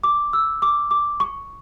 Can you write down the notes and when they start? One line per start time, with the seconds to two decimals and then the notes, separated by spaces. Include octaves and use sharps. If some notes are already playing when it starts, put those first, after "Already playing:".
0.04 D6
0.33 E6
0.62 D6
0.91 D6
1.20 C#6